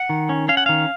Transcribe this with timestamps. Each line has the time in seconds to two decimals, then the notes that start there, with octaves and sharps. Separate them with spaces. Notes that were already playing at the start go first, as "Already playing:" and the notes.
Already playing: F#5
0.10 D#3
0.29 C#4
0.49 C#4 F5
0.57 F#5
0.66 D#3 F5